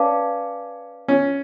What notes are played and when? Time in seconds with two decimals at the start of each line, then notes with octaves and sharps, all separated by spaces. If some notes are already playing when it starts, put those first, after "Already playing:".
Already playing: C#4 B4 D5 F5 A5 D6
1.08 C#4